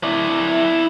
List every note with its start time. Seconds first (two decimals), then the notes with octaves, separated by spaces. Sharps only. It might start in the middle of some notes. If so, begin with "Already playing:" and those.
0.03 E4 D5